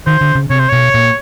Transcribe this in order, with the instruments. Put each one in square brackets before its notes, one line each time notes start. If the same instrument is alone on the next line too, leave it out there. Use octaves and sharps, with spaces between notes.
[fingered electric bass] D#3 [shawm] C5
[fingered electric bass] D3
C#3
[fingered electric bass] C3 [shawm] C#5
[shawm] C5
[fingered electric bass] B2 [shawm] C#5
[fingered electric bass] A#2